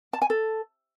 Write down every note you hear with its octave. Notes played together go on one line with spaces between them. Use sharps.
A5
G#5
A4